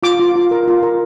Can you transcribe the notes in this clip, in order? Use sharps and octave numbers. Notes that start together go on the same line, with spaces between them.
F4 D6
F4
F4
A#4
F4
A#4